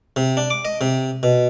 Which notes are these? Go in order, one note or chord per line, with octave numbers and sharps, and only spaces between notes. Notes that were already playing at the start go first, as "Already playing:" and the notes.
C3
D4
D6
D#5
C3
B2